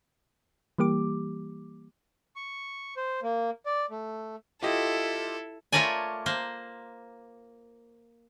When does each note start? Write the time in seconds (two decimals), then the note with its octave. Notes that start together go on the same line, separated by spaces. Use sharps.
0.78 E3 G3 A#3 G4 D6
2.36 C#6
2.97 C5
3.23 A#3
3.66 D5
3.91 A3
4.63 E4 F4 G4 A4 D#5
5.72 A3 F4 A#4 C#5 D5 G#5
6.26 A#3 C5